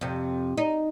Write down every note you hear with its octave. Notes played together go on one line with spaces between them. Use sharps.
F2 C3
D#4